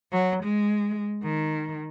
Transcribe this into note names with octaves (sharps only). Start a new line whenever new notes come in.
F#3
G#3
D#3